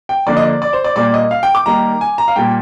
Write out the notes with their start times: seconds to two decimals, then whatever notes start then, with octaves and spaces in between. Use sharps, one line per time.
0.09 G5
0.27 D3 F3 A#3 D5
0.37 D#5
0.44 D5
0.62 D5
0.73 C5
0.84 D5
0.96 A#2 G3 A#3 D5
1.14 D#5
1.31 F5
1.43 G5
1.55 D6
1.66 D#3 G3 A#3 A#5
2.01 G#5
2.18 A#5
2.28 F5
2.36 A#2 G3 A#3 G5